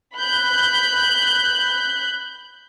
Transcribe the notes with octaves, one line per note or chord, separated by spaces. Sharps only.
B5 F#6 G6